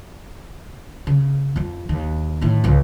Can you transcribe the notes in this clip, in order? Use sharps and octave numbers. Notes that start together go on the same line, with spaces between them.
C#3
F2 F3
D#2
A2 D#3
C#2 F3